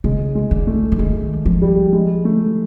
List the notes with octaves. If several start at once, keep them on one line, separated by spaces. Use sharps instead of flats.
C#3 G#3
G#3
D3
A3
E3
D#3 G#3
F3
G3
G#3
A3